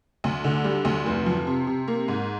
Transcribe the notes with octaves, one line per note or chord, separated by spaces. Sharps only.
D2
D3
G3
D2
F1
F3
C3
C3
A#3
G#2